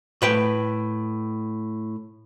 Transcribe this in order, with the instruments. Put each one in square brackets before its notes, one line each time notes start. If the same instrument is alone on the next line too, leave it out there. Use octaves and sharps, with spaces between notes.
[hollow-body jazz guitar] A2 B4 G5